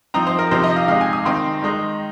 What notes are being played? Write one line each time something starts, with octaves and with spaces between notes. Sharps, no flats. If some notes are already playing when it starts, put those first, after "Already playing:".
F3 C4 D#4 A#5
C5
A#4
C3 F3 C4 D#4 C5
D#5
F5
C3 G#3 D#4 F5
G#5
D#6
D#3 C4 D#4 C6
D#3 G#3 D#4